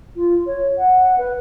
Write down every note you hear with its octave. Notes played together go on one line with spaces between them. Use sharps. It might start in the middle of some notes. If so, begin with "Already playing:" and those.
F4
C#5
F#5
B4